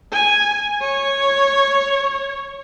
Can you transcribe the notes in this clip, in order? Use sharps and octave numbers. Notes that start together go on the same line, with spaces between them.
G#5
C#5